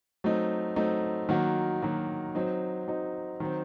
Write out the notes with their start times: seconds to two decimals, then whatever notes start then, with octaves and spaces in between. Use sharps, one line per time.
0.24 F#3 A3 C4 D#4
0.76 F#3 A3 C4 D#4
1.29 D#3 F#3 A#3 F#4
1.82 D#3 F#3 A#3 F#4
2.35 F#3 C4 D#4
2.88 F#3 C4 D#4
3.40 D#3 F#3 C4